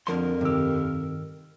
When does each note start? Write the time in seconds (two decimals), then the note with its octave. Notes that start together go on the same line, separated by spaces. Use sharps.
0.07 F2 D3 F3 A#4 C6
0.41 G2 C3 D#3 G4 E6